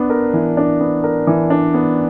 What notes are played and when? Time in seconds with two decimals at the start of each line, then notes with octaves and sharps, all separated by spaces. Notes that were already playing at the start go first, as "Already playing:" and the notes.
Already playing: B3 D4
0.10 A#4
0.34 E3
0.57 D4
0.80 B3
1.04 A#4
1.27 E3
1.50 D4
1.74 B3